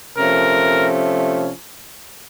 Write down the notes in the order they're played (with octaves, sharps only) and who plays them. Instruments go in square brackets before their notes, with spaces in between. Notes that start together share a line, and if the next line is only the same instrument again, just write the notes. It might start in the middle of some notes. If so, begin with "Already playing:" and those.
[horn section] C3 F3 A3 C#4 A#4